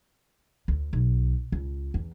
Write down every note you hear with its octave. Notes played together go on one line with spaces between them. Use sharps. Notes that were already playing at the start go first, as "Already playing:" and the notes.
D2
B1
C#2
E2